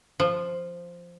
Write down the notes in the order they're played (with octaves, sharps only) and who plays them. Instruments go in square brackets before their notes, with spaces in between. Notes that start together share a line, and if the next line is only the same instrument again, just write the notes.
[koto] F3